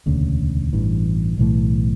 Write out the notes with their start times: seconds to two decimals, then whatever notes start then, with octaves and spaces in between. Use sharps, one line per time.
0.06 E1 D2 C#3
0.73 A1 G2 E3
1.38 B1 A2 E3 A3